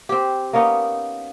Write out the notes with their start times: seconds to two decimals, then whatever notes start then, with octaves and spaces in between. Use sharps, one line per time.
0.09 C4 G4
0.53 A#3 B3 C#4 D#4